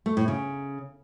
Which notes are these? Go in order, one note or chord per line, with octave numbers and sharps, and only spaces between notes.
A3
A2
C#3